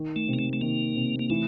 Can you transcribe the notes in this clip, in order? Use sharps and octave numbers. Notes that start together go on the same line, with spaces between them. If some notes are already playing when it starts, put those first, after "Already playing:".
Already playing: D#3
A3
C3
A#3
A3
A3
D#3 A#3
C3
A#3
E3 A3